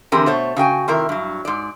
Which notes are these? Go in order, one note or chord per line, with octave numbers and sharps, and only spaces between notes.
D3 E3 C4 G4 G#4 A#4
B2 A3 C5 C#5
C#3 F#4 G5 G#5
C3 D#3 E4 A#4
G2 F#3
G#2 D5